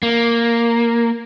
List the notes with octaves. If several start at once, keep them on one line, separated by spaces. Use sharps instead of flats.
A#3